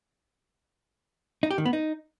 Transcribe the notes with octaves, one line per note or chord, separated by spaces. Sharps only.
D#4
G4
D#3
B3
D#4